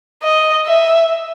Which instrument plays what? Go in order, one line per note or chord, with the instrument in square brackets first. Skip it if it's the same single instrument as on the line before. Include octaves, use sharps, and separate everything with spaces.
[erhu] D#5
E5